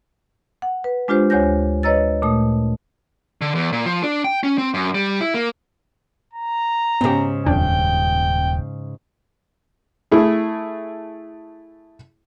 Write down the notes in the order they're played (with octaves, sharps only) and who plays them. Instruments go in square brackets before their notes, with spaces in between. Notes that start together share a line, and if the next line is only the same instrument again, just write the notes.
[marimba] F#5
B4
G#3 D4 F4 G4 C5
D2 C5 C#5 G#5 G6 A#6
B4 C#5 D#5 A#5 E6 A6
A#2 A3 D#6
[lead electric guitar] D3
E2
A#2
F3
D4
G5
C#4
C4
F#2
G3
E4
A#3
[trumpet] A#5
[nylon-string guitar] G#2 C#3 [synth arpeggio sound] B3 G4
[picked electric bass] D#1 [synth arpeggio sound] F2 D4 [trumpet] G5
[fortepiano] A3 E4 G#4